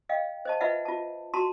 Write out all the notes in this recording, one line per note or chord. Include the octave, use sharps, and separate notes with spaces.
D#5 F5 G5
C5 D#5 A5
F4 B4 D#5 E5 F#5
F4 A5
F#4 A5 A#5 C6